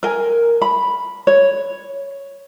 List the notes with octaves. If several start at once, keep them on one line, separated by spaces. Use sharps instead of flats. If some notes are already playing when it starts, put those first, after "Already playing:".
A#4 G#5
B5
C#5